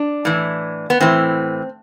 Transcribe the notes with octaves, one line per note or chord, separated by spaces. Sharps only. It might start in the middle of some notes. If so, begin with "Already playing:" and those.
Already playing: D4
A2 E3
B3
A2 E3 C4